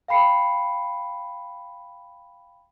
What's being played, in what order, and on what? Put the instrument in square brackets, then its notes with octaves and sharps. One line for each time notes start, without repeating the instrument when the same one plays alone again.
[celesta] F5 G5 B5 C7 C#7